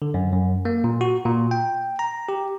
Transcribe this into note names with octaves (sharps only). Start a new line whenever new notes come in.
D3
F#2
F#2
A#3
A#2
F#4
A#2
G5
A#5
G4